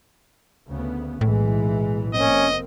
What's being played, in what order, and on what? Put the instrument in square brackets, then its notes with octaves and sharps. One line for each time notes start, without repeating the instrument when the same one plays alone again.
[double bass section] D2 C#3 B3
[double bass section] B1 E3 [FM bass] A2 [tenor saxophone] G#3
[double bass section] F1 A#3 C4 [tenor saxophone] C#4 [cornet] D#5